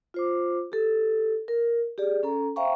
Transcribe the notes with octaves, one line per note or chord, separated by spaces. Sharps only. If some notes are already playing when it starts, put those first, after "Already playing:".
F4 C5 D6
G4 A4
A#4
G4 G#4 D5
C#4 A4 A#5
C5 E5 F5 G5 A#5 C#6